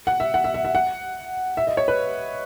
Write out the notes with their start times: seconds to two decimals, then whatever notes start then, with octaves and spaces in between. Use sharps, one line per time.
0.07 F#5
0.20 E5
0.34 F#5
0.44 E5
0.54 E5
0.65 E5
0.75 F#5
1.57 E5
1.67 D#5
1.77 C#5
1.88 B4